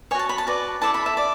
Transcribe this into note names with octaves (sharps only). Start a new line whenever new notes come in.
F#4 C#5 G#5 A5
B5
A5
F#4 B4 D5
E4 A4 D5 A5
B5
E5
D5